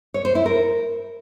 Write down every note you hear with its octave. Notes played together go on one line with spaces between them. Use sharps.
C#5
C5
E4
A#4